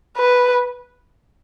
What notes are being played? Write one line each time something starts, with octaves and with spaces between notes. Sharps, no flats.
B4